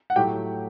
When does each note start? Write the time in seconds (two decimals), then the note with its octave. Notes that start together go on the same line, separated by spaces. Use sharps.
0.10 F#5
0.16 A2 F#3 A3 G4 G5